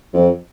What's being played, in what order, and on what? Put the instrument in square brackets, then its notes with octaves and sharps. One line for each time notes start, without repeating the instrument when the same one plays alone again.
[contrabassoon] F2